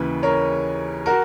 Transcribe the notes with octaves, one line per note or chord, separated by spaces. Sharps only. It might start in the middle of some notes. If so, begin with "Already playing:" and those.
Already playing: D#2 C#3 E3 B4
A#4 C#5
F#4 A#4